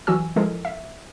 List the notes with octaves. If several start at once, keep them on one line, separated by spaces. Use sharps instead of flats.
E3 F#3 F#4 G#5 E6
F3 G#3 E4 A4 A#4
E5